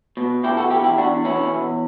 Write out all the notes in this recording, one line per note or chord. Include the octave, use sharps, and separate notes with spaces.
B2
B2 E4 G4
F#4 A4
E2 E4 G4
E4 G4
E2 D4 F#4
B2 C#4 E4
E2